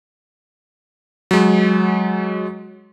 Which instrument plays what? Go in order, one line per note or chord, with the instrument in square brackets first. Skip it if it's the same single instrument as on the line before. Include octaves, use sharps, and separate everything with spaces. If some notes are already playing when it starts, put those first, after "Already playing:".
[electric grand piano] F#3 G#3